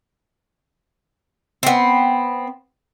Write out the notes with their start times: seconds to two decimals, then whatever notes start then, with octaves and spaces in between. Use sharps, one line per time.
1.63 B3 C4